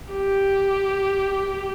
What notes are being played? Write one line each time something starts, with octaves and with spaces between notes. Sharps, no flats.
G4